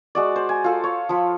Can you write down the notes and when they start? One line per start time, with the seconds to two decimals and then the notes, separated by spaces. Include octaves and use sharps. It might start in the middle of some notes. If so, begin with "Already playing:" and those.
0.15 G#3 F#4 D5
0.36 C5
0.49 G#5
0.64 F4 A4
0.84 C#5
1.09 F3 B5